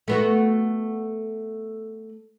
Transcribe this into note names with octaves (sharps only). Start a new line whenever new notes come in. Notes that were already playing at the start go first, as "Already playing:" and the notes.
A3 B3 F#4